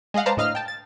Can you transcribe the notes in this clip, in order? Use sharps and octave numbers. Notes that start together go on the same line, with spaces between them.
G#3 G#4 D#5 F5 F#5
B4 C5 D5 F5 A5 A#5
A2 D3 D#5 F5 F6
G5 A5
A6